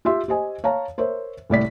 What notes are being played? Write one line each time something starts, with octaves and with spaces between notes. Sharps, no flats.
F4 G4 E5 C6
G4 C5 D#5 G#5
C#5 F5 A5 A#5
A#4 C5 C#5 E5
C2 A2 D5 B6